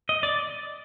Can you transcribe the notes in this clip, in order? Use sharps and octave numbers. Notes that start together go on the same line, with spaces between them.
D#5
D5